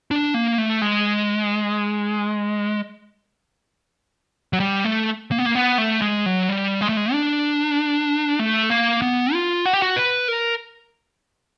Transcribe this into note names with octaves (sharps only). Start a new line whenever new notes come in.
D4
A#3
A3
G#3
F#3
G3
A3
A#3
B3
A#3
B3
A3
G#3
F#3
G3
G#3
A3
G#3
D4
A3
A#3
B3
F4
F#4
G4
F#4
B4
A#4